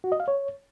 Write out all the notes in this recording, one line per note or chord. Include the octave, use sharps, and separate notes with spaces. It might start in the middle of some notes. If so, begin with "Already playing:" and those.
F#4
D#5
F5
C#5